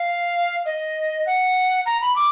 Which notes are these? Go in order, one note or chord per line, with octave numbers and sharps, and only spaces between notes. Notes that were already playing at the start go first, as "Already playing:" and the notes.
Already playing: F5
D#5
F#5
A#5
B5
D6